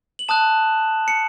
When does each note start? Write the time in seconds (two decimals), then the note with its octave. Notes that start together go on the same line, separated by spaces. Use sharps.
0.19 F#7
0.28 A5 D#6 F#6 E7
1.08 C#7